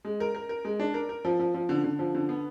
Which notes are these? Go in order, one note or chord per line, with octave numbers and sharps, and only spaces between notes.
G#3
A#4
A#4
A#4
G#3
D4
A#4
A#4
F3
F3
F3
D3
D3
F3
D3
B3